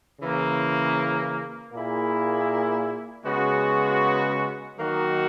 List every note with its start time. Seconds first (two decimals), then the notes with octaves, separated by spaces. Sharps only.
0.20 C#3 E3 A#3
1.73 A#2 A#3 E4 G#4
3.25 C#3 G#3 B3 F#4
4.78 D#3 F#3 A#3 D#4 F#4